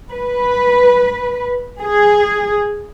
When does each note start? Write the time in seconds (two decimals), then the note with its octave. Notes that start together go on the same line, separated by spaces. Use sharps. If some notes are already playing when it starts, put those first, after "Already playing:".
0.11 B4
1.82 G#4